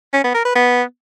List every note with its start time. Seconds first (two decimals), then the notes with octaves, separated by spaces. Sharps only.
0.13 C#4
0.24 B3
0.34 A#4
0.45 B4
0.55 B3